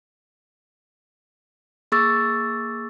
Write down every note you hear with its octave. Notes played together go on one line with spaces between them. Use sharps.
A#3 G#4 C#6 E6 A6